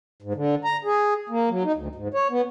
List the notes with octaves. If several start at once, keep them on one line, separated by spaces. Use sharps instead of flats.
G#2
D3
A#5
G#4
A#3
F#3
D#4
D2
G#2
C#5
B3